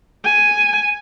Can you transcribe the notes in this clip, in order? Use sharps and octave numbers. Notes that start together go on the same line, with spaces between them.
G#5